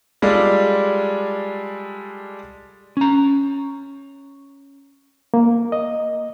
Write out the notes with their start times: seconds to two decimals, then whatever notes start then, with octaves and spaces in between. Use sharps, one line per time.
0.22 G3 G#3 F4 A4 D5
2.97 C#4 A#5
5.34 A#3
5.72 D#5